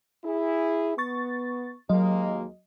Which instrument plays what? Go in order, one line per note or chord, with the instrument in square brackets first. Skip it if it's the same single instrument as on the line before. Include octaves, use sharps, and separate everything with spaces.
[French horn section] E4 G#4
[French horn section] B3 [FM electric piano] C#6 A6
[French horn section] D#2 G#3 A#3 [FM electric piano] F#3 D#5